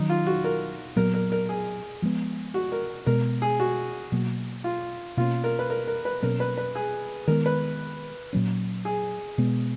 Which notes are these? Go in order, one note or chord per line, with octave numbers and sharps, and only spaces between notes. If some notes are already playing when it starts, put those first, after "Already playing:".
Already playing: D#3 F#3 C#4 D#4
F4
F#4
A#4
A#2 F#3 B3 A#4
A#4
A#4
G#4
F3 G#3 B3
F#4
A#4
B2 G#3 B3 A#4
G#4
F#4
B2 F#3 A#3
F4
B2 A#3 C#4 F4
A#4
B4
A#4
A#4
B4
B2 F#3 A#3 C#4 A#4
B4
B4
G#4
D#3 G#3 B3 A#4
B4
A#2 F#3 C#4
G#4
B2 G#3 B3